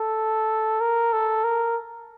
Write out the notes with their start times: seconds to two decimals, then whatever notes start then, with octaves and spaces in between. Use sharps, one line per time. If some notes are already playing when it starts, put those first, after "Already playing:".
Already playing: A4
0.81 A#4
1.13 A4
1.44 A#4